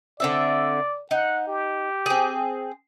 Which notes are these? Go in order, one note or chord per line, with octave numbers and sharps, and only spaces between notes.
D3 C4 D5 E5
D#4 F#5
G4
C4 G#4